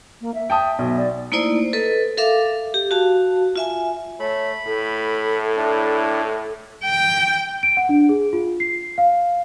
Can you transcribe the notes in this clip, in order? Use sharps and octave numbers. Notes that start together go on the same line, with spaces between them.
A#3
E5
G5 A5 D#6
B1
D5
A3 A#3 D#4 E4 C5 D5
A4 B4 D#5
A4 A#4 E5 F5 D6
G4
F#4 F5 A5
F4 E5 G#5
A3 C#5 B5
A2 A4
D4 E4
G5
D7
F#5
D4
G#4
F4
C7
F5